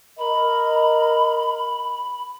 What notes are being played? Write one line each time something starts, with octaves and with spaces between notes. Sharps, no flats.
A#4 D#5 B5